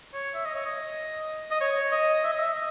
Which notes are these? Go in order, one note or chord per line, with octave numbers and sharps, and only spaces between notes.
C#5
E5
D#5
C#5
D#5
D#5
C#5
D#5
E5
D#5
E5
D#5